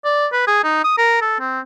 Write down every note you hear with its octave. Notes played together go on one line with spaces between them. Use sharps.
D5
B4
G#4
D#4
D#6
A#4
A4
C4